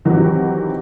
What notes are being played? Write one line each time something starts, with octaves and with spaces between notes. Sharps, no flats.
C3 D#3 E3 F#3